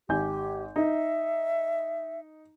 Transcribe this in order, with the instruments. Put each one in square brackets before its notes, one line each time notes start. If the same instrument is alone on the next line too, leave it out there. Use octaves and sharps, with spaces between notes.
[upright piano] G#1 G#5 G6 [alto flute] G4
[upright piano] D#4 [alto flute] E5